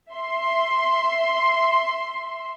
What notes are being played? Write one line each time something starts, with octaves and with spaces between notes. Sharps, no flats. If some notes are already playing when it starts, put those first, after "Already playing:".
E5 C6